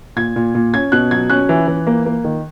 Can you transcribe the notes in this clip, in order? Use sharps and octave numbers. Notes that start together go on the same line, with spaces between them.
A#2 G#6
A#2
A#2
C#4 G#6
B2 F#6
F#3 G#6
C#4 F#6
E3
E3
A#3
A#3
D#3